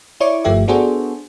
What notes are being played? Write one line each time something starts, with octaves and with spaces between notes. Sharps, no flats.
E4 C#5 D5 C#6 D6
G1 F3 A3 G4 E5
B3 D4 F#4 G#4 A4 C5